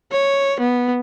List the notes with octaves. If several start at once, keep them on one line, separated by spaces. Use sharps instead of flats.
C#5
B3